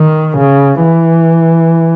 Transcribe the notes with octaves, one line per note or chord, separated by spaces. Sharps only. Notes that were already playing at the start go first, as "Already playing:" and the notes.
Already playing: D#3
C#3
E3